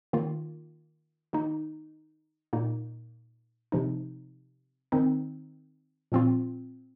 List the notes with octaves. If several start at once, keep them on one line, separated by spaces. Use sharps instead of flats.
D#3 A#3 F4
D#3 A#3 D#4
A#2 A#3 D#4
C3 F3 D#4
D#3 C4 D#4
A#2 F3 C4 F4